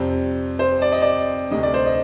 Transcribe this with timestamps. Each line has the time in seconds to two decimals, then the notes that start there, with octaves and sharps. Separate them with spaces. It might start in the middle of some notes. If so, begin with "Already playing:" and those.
Already playing: F2 C3 G3 C4
0.59 C5
0.82 D5
0.92 D#5
1.02 D5
1.51 D2 C3 G3 D#5
1.63 D5
1.74 C5
1.86 D#5